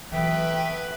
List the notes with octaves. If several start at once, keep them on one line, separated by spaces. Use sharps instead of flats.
E3 F#3 A3 B3 B4 E5 G5